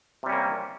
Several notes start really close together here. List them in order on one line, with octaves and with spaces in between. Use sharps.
C3 G3 C#4 A#3